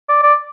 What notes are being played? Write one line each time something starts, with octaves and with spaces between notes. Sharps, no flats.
D5
D5